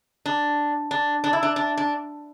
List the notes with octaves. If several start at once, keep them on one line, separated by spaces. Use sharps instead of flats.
D4
D4
D4
E4
D4
D4
D4